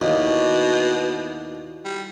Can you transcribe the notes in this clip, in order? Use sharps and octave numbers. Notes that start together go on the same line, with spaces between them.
D#2 B2 E4 F#4 D5
G3